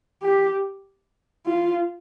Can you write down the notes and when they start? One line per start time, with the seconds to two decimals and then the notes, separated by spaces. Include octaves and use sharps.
0.22 G4
1.46 F4